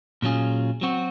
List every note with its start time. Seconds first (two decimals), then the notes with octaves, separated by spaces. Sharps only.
0.22 A#2 F#3 C#4 F4 G#4
0.81 F#3 C4 F#4